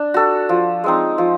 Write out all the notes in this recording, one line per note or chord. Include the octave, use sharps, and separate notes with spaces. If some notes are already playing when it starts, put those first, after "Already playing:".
Already playing: D4
F#4 A4
F3
G#3 C4 D#4
F3